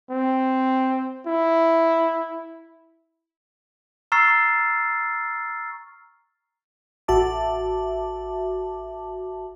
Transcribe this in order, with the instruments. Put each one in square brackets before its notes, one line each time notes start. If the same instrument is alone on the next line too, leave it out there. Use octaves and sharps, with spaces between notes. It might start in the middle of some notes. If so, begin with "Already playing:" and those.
[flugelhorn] C4
E4
[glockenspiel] A#5 C#6 E6 F6 A6 C7
[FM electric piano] A1 F#4 E5 A5 D6